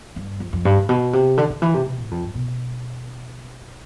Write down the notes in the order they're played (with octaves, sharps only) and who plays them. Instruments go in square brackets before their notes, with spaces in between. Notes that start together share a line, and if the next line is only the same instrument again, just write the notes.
[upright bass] G2
F2
F2
G2
A2
B2
C3
D3
D3
E3
C3
B2
A2
F2
G2
B2